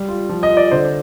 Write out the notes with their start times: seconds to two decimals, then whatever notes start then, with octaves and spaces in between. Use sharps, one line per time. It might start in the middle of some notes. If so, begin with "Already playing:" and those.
Already playing: G3
0.09 F4
0.29 F3
0.43 D#5
0.50 F4
0.57 D5
0.71 D3 C5